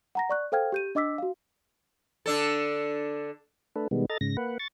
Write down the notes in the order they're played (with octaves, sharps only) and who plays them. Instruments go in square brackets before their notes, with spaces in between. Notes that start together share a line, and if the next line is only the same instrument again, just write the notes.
[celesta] F#5 A#5 A#6
D5 C#6 F#6
A4 C5 F5 G5 F6 G#6
G4 G6 D#7
D4 D#5 D6 E6 B6
F#4 F5
[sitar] D3 D4 A4
[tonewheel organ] A3 D4 A4 B4
B2 D#3 G3 G#3 B3
A4 D#5 A#5 A6
G#2 C#3 A#6
A#3 B4 F#5
C#6 A6